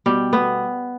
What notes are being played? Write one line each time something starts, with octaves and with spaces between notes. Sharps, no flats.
B2 G3
B2 B3